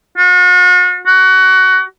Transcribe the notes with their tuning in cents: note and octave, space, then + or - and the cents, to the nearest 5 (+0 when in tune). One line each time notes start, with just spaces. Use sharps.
F#4 -45
F#4 +20